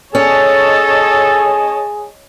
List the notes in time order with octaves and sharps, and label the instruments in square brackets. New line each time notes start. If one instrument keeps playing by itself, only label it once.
[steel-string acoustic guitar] C#4 [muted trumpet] G#4 [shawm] A4 [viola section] C#5 D#5 A5